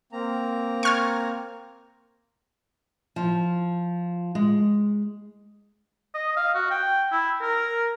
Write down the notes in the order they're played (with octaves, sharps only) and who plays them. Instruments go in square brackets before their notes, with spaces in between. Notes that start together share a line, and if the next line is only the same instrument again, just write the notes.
[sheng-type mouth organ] A#3 C4 A#5
[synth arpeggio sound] C#6 F6 G#6
[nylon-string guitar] F3
G#3
[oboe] D#5
F5
F#4
G5
E4
A#4